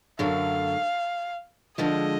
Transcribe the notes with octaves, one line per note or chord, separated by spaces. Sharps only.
F#2 D3 F#3 A3 F5
D3 F3 G#3 D#5